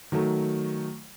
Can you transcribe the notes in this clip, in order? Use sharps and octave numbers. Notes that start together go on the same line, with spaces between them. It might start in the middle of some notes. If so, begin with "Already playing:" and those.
D#3 F#3 A3